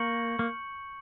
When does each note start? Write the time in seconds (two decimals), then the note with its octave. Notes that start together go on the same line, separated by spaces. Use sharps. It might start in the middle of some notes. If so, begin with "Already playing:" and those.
Already playing: A#3 C#6 G6 C#7 F#7
0.39 A#3